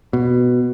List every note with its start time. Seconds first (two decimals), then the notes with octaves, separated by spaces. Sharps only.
0.13 B2